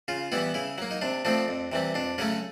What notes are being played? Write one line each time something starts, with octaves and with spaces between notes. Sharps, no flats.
C#3 F4
E3 G3 B3 E4
C#3 E4
F#3 A#3
D#4
C3 D4
F3 A3 C4 D4
F2
C3 E3 G3
F2 D4
C#3 F#3 A3 C#4